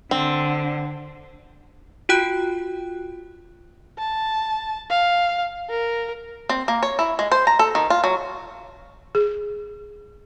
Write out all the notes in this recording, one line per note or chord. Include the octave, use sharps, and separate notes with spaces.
D3 C4
F4 F#4 G5 F#6 D7
A5
F5
A#4
C4
A#3
C#5
E4
G#3
C5
A#5
A4
D#3
F4
F#3
G#4